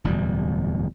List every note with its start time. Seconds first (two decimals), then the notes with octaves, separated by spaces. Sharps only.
0.04 D1 E2 B2 G3